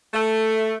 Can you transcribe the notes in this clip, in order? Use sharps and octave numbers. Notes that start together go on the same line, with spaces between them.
A3